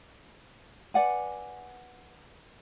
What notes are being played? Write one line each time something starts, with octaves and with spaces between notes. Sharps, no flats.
B4 D5 F#5 G#5